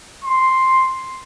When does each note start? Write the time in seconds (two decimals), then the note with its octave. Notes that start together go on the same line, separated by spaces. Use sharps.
0.24 C6